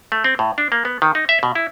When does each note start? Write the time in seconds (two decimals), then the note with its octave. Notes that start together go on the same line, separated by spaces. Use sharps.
0.12 A3
0.24 C4
0.39 A2
0.58 D4
0.72 A#3
0.85 B3
1.02 D#3
1.15 D#4
1.29 E5
1.43 B2
1.55 E4